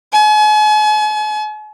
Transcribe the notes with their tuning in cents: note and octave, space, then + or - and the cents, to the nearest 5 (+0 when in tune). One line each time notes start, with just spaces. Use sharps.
G#5 +40